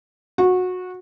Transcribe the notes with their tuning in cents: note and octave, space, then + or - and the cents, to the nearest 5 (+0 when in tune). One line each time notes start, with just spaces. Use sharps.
F#4 -20